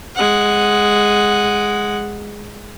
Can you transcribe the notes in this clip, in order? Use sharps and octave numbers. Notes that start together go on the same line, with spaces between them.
G#3 F#5